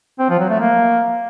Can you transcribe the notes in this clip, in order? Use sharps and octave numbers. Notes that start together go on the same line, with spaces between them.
C4
F3
F#3
A3
A#3